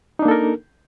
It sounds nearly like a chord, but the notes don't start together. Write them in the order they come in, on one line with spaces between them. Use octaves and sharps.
D#4 D4 A#3 A4 A#4